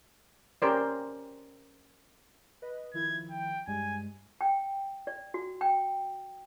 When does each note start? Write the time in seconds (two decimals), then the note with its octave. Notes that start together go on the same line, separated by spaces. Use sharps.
0.62 C#4 G4 A#4 C5 D5
2.62 B4 D#5
2.94 D#3 F3 E4 G#6
3.30 G5
3.67 G2 G3 G#3 G#5
4.41 G5
5.07 D5
5.34 F#4
5.61 G5